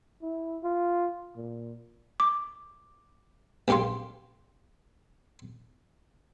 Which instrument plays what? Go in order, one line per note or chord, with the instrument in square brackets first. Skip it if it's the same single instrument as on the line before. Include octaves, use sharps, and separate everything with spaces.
[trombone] E4
F4
A#2
[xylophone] D6
[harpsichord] A#1 F#2 G4 F5 C6